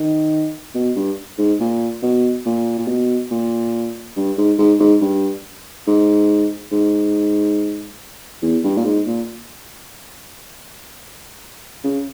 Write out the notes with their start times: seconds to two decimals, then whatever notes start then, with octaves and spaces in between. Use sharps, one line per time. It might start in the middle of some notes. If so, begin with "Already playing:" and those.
Already playing: D#3
0.75 B2
0.96 G2
1.38 G#2
1.60 A#2
2.02 B2
2.46 A#2
2.79 A#2
2.87 B2
3.31 A#2
4.17 G2
4.38 G#2
4.58 G#2
4.80 G#2
5.01 G2
5.87 G#2
6.72 G#2
8.42 E2
8.64 G2
8.77 A#2
8.85 G#2
9.06 A#2
11.84 C#3